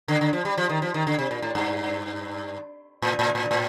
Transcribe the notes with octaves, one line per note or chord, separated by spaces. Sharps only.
D3
D3
F3
G3
F3
D#3
F3
D#3
D3
C3
A#2
A2
G2
A2
A2
A2
A2